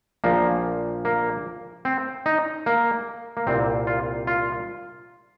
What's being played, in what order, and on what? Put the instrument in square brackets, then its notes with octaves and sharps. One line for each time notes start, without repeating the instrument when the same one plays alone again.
[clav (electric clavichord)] A#1 A#2 F3 A#3
A#3
C4
D#4
A#3
A#3
C2 A#2 G3 C4
F4
F4